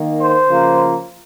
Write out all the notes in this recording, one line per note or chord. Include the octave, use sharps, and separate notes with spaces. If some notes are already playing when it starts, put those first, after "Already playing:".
Already playing: D#3 A#3
C5
C#3 F3 A#3